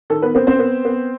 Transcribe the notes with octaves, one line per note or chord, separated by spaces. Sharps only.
D#3 A4
B3 B4
B3 C4 C5
C4 C5
B3
B3